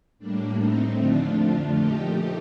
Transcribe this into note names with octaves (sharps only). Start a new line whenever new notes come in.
A2 G3 A#3 D4
A2 A3 C4 D#4
D#2 D3 F3 A3 D4 F4
F2 D3 F3 A3
A#2 F3 A3 D#4 G4